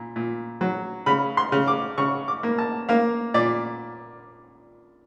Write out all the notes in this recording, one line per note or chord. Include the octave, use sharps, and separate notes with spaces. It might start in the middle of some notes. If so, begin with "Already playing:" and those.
Already playing: A#2
A#2
F#3
C#3 B5
C6
C#3
D6
C#3 C#6
D6
A#3
A5
A#3 F5
A#2 D5